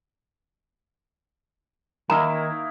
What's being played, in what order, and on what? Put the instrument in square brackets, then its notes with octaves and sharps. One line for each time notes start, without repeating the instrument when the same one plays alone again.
[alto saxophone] D#3 [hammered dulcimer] A#3 D#4 E4 [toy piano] A#5